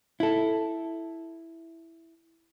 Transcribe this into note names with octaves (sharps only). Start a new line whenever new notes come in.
E4 A4